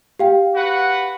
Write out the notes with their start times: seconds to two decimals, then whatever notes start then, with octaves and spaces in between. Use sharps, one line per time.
0.19 G4 F5 G5
0.55 F#4 B4 F#5